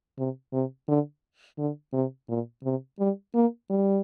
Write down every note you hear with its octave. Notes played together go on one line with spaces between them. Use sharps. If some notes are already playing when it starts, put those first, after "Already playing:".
C3
C3
D3
D3
C3
A#2
C3
G3
A#3
G3